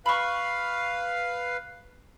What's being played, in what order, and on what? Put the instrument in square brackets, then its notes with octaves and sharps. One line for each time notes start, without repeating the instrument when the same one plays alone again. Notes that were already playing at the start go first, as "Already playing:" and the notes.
[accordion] B4 F5 [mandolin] B5 C#6